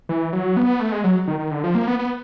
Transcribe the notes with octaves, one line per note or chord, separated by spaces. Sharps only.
E3
F#3
B3
A3
G#3
F#3
D#3
D#3
D3
F3
A#3
B3
B3